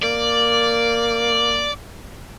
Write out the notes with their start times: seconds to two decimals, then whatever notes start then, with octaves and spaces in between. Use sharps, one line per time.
0.03 A#3 D5